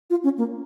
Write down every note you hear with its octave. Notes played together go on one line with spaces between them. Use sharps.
F4
C#4
A#3